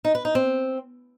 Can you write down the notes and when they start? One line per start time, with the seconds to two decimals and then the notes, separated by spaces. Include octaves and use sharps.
0.05 D#4
0.15 B4
0.25 D#4
0.35 C4